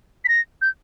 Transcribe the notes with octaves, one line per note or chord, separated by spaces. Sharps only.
B6
A#6
G6